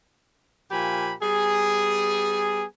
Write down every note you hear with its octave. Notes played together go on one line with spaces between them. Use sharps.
A#2 F3 G4 G#5 B5
G3 B3 G#4